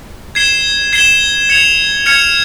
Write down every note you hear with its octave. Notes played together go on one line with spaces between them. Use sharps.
G#6 C7 E7 G7
G#6 C7 E7 G7
G#6 C#7 F7
F6 G#6 C#7 F7